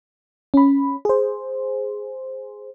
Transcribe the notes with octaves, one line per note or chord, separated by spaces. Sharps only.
C#4 B5
G#4 C5